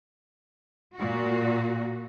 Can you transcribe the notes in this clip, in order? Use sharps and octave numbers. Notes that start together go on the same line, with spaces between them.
A#2 F#4